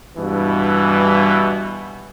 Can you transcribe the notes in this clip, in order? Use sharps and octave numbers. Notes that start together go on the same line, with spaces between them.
G2 B2 E3